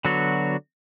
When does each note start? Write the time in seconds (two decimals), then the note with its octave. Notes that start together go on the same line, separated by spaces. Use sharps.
0.05 D3 F#3 B3 F#4